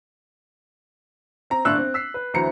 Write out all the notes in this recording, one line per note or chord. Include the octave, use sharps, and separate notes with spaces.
C4 A#5
G1 A2 D4 D5 E6 F#6
C4
E6 B6 C7
B4
D2 E3 F#3 C5 A#5 C#7